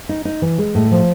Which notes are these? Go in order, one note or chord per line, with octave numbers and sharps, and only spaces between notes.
D#4
D#4
E3
G#3
A2
F3